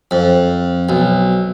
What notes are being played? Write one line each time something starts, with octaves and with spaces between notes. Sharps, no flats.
F2
B1